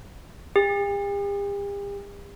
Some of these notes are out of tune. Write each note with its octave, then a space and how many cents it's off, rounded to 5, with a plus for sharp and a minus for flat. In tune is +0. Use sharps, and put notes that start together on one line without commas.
G4 +45